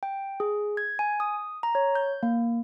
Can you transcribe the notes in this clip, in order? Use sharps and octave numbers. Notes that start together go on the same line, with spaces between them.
G5
G#4
G#6
G#5
D#6
A#5
C#5
G6
A#3